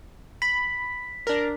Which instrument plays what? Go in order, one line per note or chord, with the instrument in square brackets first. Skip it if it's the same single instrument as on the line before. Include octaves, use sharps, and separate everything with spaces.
[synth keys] B5 [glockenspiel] B6
[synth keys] D4 A#4